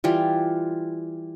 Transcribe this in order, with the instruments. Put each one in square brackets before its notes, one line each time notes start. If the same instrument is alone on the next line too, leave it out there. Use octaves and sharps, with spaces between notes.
[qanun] E3 G3 F4